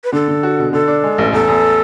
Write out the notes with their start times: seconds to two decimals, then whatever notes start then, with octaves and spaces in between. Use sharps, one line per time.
0.04 B4
0.13 D3 A4
0.28 D3
0.43 F#4
0.59 B2
0.73 D3 A4
0.88 D4
1.04 G#3
1.18 A1
1.32 E2 A4
1.47 E2